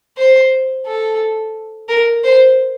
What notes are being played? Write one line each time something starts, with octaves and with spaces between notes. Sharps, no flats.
C5
A4
A#4
C5